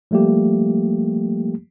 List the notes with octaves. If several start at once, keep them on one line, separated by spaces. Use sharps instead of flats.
F3 G3 A3 A#3 G4